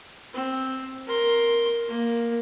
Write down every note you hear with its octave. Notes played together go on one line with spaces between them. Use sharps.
C4
A#4 C6
A#3